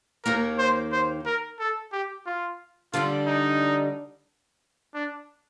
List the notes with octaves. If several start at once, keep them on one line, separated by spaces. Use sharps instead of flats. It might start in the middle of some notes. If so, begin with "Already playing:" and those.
D#2 D#3 A#3 A#4
C5
C5
A#4
A4
G4
F4
D3 G3 D4 F4
D#4
D4